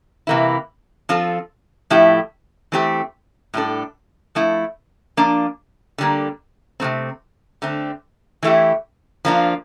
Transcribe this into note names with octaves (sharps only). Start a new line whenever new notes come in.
C3 E3 A#3 E4
F3 C4 F4 A4
A2 F3 A3 E4 G4
E3 A3 C4 G4
A2 G3 D4 A4
F3 A3 E4
F3 A#3 D4
D3 G3 A#3
C3 F3 A3 C4
D3 A3 C4
E3 A3 E4 G4
F3 A#3 D4 F4